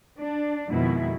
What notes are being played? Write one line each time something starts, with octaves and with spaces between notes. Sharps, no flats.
D4
F2 B2 D#3 G#3 E4